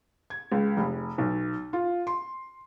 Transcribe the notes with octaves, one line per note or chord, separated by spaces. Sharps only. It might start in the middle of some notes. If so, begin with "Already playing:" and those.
G#6
C#2
F1
B1
F4
C6